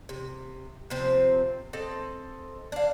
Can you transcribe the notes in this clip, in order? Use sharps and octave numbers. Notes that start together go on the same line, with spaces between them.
C3
C3 F3 C4 C5
C4 A4 D#5
D4 F5